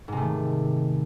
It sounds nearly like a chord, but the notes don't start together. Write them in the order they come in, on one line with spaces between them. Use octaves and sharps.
G#2 C3 A3 D#3